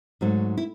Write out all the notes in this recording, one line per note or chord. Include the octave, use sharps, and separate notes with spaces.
G#2 F#3 A3 D#4
E4